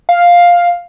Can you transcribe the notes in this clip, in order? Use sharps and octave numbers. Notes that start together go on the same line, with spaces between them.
F5